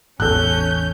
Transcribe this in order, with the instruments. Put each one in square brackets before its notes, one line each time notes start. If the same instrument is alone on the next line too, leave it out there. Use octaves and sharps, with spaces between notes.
[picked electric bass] A1 E2 [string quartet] C#4 G6 [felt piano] A4 F#6